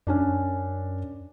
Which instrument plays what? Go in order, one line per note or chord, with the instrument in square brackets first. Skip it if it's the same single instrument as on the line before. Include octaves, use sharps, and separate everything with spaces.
[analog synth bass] F#2 [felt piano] C#4 D4 D5